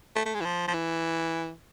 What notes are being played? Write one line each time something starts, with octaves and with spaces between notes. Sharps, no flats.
A3
A3
G#3
E3
F3
F3
E3